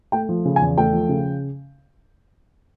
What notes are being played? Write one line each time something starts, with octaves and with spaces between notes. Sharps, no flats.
A3 G5
F3
C#3
G#5
E2
A3 G5
F3
C#3